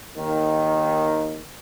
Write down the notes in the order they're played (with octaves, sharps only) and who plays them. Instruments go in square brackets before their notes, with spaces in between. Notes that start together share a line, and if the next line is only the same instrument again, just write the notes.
[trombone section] D#2 D#3